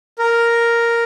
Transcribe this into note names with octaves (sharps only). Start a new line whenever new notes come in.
A#4